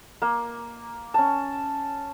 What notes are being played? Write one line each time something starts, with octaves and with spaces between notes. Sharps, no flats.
A#3
C#4 A5